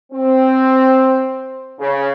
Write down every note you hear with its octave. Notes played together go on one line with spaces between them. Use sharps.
C4
C#3